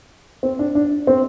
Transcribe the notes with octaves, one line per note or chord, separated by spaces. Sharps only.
C4
D4
D4
C4